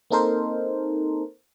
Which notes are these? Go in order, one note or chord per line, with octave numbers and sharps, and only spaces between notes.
A#3 C4 D#4 A4 A#4 C5